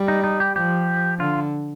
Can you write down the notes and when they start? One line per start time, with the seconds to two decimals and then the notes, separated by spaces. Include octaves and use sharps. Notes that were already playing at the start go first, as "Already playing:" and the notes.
Already playing: G3
0.08 D#4
0.24 D#4
0.40 G4
0.56 F3 G4
1.19 D3 F4